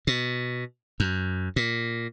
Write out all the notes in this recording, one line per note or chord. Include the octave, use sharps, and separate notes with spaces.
B2
F#2
A#2